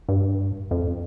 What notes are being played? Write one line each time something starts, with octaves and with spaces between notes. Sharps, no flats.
G2
F2